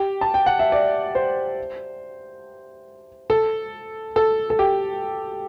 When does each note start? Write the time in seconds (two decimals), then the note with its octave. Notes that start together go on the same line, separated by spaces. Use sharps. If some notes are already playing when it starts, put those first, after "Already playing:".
Already playing: G4
0.21 A5
0.34 G5
0.46 F#5
0.59 E5
0.72 D5
1.15 C5
3.30 A4
4.16 A4
4.50 A4
4.59 G4